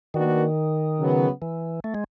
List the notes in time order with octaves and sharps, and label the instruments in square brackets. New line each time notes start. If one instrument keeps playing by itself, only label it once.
[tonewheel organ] D#3 [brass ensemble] A#3 D4 F#4 B4 D5
[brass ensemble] C#3 F#3 B3
[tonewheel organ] E3
A3
G#3